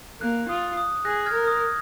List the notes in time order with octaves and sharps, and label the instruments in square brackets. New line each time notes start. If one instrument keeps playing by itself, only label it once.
[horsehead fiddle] A#3 [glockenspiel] F#6
[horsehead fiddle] F4 [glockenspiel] D#6
[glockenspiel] D#6
[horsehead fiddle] G#4 [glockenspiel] F#6 A#6
[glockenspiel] F6 G#6
[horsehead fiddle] A#4
[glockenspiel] D#6